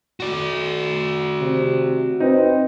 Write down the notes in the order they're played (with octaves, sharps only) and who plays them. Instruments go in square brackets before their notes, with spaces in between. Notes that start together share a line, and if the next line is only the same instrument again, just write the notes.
[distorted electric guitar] F#4 D5
[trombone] C3
[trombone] C4 [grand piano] D#4 [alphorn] B4